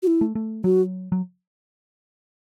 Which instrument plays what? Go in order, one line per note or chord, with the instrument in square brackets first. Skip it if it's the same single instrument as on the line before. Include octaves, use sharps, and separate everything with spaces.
[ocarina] F#4
E4
[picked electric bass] A3
A3
[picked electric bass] F#3 [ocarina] F#4
[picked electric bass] F#3